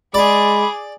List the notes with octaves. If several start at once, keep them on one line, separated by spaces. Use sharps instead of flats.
G#3 G#4 D5 B5 D6